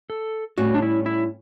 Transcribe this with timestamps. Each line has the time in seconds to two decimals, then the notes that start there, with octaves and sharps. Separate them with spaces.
0.10 A4
0.58 A2 G3 C#4 F#4
0.74 D4
0.82 E4
1.06 E4